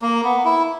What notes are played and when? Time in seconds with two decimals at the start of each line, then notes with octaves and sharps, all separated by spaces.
0.02 A#3
0.24 B3
0.45 E4